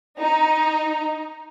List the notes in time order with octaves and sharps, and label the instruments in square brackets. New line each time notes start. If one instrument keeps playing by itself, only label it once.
[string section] D#4